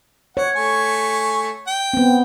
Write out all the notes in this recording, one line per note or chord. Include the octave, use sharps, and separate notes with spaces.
C#5 F#5
A3 G#5 C#6
G5
B3 C4